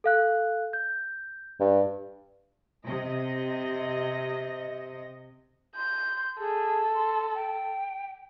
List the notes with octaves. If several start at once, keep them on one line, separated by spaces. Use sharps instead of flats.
A4 F5 F#6
G6
G2
C3 D#5
C6 G6
G#4 A4
C6
G5